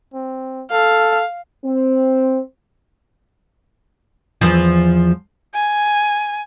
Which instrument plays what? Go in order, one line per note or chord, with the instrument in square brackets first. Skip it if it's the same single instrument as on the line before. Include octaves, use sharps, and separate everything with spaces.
[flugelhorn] C4
[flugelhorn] A4 [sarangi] F5
[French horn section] C4
[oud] E2 F3
[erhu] G#5